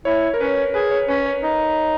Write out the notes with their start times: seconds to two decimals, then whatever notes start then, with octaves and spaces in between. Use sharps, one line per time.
0.05 E4 C#5
0.34 A#4
0.40 C#4 B4
0.74 G#4 B4
0.91 C#5
1.08 C#4 B4
1.26 C#5
1.43 D#4